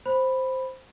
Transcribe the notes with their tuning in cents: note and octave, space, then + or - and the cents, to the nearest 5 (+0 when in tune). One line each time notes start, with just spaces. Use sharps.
C5 +0 B5 +0